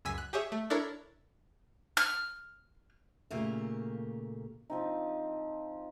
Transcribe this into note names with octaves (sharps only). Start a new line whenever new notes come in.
C#2 F#2 G#5 E6 B6
F#6
G4 G#4 C#5 E5
A3
D4 E4 A4 A#4 C#5
F6
A#2 C#3 A3 A#3 G4 A#4
F3 C4 D#4